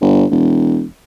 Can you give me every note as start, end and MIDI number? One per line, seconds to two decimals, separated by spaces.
0.01 0.25 31
0.31 0.85 28